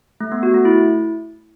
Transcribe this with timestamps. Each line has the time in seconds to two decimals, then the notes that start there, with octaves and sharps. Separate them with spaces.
0.21 A3
0.32 B3
0.43 F#4
0.54 A3
0.65 E4